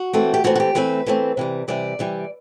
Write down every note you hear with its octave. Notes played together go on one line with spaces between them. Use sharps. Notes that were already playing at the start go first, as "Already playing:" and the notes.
Already playing: F#4
E3 A3 C4
G4
E3 A3 C4 F#4
F#4
G4
E3 A3 C4 B4
E3 A3 C4
C3 E3 G3
C3 E3 G3 D5
C3 E3 G3